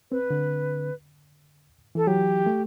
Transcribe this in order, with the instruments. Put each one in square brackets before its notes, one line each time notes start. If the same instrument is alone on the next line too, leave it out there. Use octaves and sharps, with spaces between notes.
[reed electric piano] C4 [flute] B4
[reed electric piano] D3
[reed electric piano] E3 [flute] A4
[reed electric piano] F#3 [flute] G4
[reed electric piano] A3